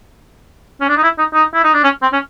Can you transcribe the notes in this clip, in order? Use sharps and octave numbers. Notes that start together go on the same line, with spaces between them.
C#4
D4
D#4
E4
D#4
D#4
E4
D#4
D4
C#4
C4
C#4